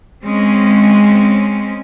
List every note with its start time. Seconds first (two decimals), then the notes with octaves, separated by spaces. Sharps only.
0.24 G#3 C4 C#4